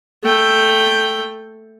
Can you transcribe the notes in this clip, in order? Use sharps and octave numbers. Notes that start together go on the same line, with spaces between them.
A3 G5